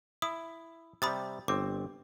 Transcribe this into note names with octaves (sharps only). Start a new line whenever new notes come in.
E4 D#6
C3 G3 B5 D#6 A6
G1 C4 D6